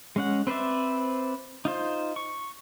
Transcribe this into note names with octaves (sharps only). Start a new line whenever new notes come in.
G#3 C#4 F#5
C4 B4 C5 D5 E5
D#4 F4 C5
C#6